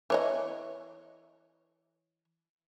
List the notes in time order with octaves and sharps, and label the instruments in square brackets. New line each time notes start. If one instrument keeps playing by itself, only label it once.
[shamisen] E3 C#5 D#5